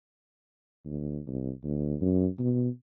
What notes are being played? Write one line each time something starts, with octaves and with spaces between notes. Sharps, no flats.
D2
C2
D2
F#2
B2